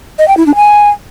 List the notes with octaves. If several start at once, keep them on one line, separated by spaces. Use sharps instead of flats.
D#5
G5
E4
D4
G#5